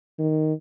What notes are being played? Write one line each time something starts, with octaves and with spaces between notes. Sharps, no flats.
D#3